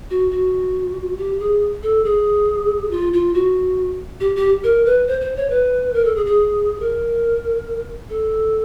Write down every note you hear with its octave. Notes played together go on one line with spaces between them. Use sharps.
F#4
F#4
G4
G#4
A4
G#4
F4
F4
F#4
G4
G4
A#4
B4
C5
C5
C#5
B4
A#4
A4
G#4
G#4
A#4
A4